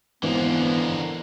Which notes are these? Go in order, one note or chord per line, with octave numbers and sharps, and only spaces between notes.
G#1 D3 E3 A#3 B3 C5